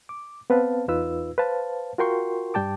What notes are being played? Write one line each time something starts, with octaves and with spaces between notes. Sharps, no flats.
D6
B3 C4 B4 F5 A5
E2 D#4 F4 B4 E6
B4 C5 F5 A5
F4 F#4 A#4 G5 C6 C#6
G2 G3 G5 A5 D6